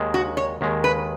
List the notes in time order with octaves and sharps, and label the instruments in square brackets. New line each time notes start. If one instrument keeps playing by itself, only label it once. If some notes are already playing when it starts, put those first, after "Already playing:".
Already playing: [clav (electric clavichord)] D#2 D#3 G#3
[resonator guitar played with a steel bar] F#4
C#5
[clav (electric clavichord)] D#2 D#3 G#3
[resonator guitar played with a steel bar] B4